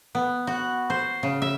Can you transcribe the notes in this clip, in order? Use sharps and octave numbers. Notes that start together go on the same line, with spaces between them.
B3
F#4
C5
C#3
E5